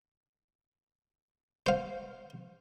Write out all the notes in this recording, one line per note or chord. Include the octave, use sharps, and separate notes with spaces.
C5 F5